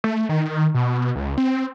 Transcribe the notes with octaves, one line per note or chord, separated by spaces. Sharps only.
A3
D#3
B2
C#2
C4